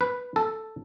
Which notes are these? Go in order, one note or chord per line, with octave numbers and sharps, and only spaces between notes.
B4
A4